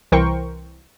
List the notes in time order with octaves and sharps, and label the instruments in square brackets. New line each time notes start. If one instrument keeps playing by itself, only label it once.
[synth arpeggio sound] C2 E3 A#4 C5 G5 C#6